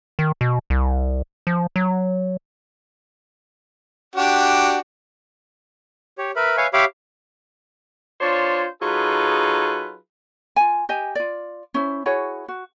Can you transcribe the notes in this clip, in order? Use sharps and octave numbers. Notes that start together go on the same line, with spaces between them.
D#3
B2
C2
F3
F#3
D4 F#4 G4
G4 C#5
A#4 B4 E5 B5
B4 C#5 E5 F5 G#5 C#6
G4 C#5 E5 F5 B5 D6
D4 F4 C5 C#5
F#3 D#4 F4 G#4 A4 B4
F4 G#5
G4 D#5 G#5
F4 D5
C#4 E4 C5
E4 F#4 G#4 C#5
F#4